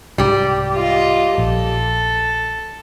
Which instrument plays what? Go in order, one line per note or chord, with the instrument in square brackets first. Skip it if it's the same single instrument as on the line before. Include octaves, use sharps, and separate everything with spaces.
[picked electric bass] C2 G#2 [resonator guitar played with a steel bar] G3 G4
[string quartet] F4 D#5
[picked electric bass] A#1 [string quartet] A4